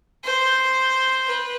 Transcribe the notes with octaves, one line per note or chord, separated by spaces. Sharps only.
C5
B4